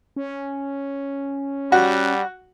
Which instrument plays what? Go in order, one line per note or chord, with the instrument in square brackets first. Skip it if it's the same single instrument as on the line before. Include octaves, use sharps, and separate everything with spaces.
[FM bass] C#4
[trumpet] G3 [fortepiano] F#4